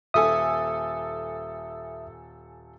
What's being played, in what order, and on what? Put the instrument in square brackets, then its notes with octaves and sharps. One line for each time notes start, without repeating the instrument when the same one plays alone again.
[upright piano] D#1 A4 G#5 [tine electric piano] E5 D#6